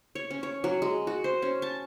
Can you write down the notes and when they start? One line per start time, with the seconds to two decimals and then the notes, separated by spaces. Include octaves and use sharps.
0.15 C#5
0.30 C#4
0.43 C#5
0.64 F#3
0.82 G#3
1.07 F#4
1.24 C5
1.42 C#4
1.62 A5